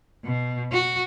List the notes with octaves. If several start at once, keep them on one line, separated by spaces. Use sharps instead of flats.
B2
F#4